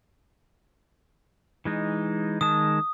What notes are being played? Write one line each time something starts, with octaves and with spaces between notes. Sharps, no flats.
E3 G#3 D#4
D#3 G#3 A5 D#6